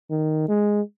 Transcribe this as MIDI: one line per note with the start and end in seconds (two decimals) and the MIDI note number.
0.10 0.44 51
0.48 0.81 56